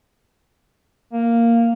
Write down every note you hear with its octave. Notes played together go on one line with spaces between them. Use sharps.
A#3